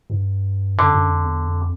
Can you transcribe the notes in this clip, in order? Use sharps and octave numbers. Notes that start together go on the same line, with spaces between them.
G2
F#2 D3
F#2
F2
E2
F2